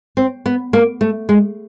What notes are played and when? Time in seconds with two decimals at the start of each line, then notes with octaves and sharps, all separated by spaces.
0.17 C4
0.46 B3
0.73 A#3
1.01 A3
1.29 G#3